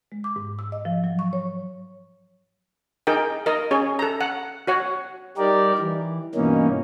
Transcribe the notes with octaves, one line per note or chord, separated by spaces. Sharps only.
G#3
D6
G#2
E6
D#5
F3
F#3
C#6
C#5
D#4 G#4 A#4 G5
A#4 D#5
C#4 G#4 C#5
A4 A#5
F#5
F#4 C#5 F#5
G3 D#4 G4 A#4 D5
E3
G2 B2 E3 A#3 C#4 D#4